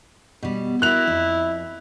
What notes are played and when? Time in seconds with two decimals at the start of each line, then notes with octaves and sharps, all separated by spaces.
0.43 B2 G3
0.82 E4 F#4 A#4 F#6 F7
1.07 F2